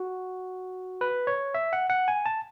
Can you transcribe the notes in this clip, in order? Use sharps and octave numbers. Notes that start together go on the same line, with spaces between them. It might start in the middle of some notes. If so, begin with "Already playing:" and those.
Already playing: F#4
B4
C#5
E5
F#5
F#5
G#5
A5